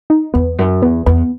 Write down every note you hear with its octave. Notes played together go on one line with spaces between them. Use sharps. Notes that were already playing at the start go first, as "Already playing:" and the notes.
D#4
E2 B3
F#2
E2 B3
E2 B3